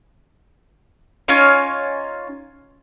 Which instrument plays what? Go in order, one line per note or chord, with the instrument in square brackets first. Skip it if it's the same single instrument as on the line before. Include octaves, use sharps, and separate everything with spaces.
[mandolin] C#4 D#4 F4 C#5